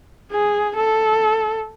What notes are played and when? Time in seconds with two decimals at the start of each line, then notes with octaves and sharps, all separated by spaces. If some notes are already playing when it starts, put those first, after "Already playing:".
0.32 G#4
0.76 A4